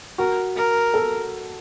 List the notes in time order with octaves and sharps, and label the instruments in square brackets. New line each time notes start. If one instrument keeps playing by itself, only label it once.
[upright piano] F#4 [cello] A#4
[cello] A#4
[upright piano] A4